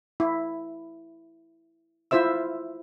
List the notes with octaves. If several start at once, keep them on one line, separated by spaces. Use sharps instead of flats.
E4
E4 F4 C5 E5 E6